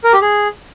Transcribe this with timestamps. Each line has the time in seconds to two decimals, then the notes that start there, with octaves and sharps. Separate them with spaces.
0.04 A#4
0.13 G4
0.22 G#4